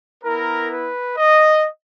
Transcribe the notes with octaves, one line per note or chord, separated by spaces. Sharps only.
B3 E4 A#4
B4
D#5